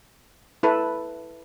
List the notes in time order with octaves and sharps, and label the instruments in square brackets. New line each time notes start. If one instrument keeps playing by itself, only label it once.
[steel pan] E4 A4 B4